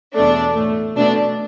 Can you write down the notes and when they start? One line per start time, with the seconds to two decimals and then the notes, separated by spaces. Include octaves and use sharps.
0.14 E2 B2 A3 D4
0.55 A2 A3
0.96 B2 A3 D4